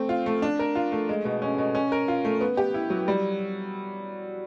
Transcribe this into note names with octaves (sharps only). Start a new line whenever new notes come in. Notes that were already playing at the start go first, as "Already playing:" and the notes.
Already playing: A3 C4
F4
A3
D4
A#4
F4
A3
G#3
B2
C#4
B2
C#4
A#4
F4
A3
B3
G4
E4
F#3
G3